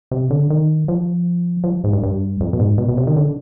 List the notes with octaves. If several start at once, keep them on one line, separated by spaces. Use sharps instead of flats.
C3
D3
D#3
F3
F3
G#2
G2
G2
F2
B2
G#2
B2
B2
C3
D#3
D3